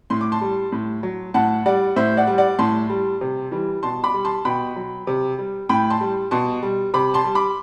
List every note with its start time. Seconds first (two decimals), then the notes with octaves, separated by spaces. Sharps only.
0.10 A2 C6
0.21 D6
0.32 A5 C6
0.41 G3
0.72 A2
1.03 F#3
1.34 A2 F#5 A5
1.66 G3 D5 F#5
1.96 A2 C5 E5
2.17 D5 F#5
2.27 G3
2.38 D5 F#5
2.59 A2 A5 C6
2.90 G3
3.21 C3
3.51 E3 G3
3.83 B2 A5 C6
4.04 B5 D6
4.14 G3
4.25 A5 C6
4.45 B2 G5 B5
4.76 F#3
5.07 C3
5.38 G3
5.69 A2 G5 B5
5.90 A5 C6
6.01 G3
6.31 B2 A5 C6
6.63 G3
6.94 C3 B5 D6
7.14 A5 C6
7.24 G3
7.35 B5 D6